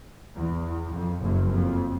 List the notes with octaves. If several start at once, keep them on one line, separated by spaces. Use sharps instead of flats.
E2
F2
F#1 F#2
F2